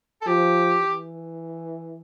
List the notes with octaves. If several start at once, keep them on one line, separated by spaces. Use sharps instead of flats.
A4
F3 G4
E3